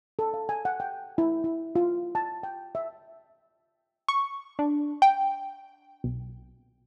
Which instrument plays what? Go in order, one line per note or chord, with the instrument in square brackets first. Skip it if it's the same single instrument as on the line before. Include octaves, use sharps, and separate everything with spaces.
[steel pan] A4
F5
G#5
F#5
G5
E4
E4
F4
A5
G5
E5
[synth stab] C#6
D4
G5
B1